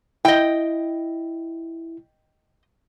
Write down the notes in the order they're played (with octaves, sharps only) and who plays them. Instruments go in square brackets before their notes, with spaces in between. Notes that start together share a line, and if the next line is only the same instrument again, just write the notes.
[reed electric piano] E4 [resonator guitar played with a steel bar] D#5 G5